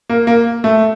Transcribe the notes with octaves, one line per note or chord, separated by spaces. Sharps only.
A#3
A#3
A3